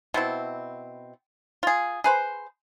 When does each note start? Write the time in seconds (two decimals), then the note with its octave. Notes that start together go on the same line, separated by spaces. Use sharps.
0.14 B2 C4 E4
1.63 F4 G#4
2.04 G#4 B4 C5